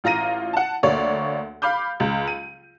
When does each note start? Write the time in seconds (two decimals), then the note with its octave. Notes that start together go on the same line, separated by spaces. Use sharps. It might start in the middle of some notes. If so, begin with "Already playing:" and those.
0.04 A1 F4 A#5 A#6 D#7
0.53 F#5 A5
0.83 D2 A#3 C#5 D5
1.62 F5 B5 D6 G6
2.00 C#2
2.28 D#7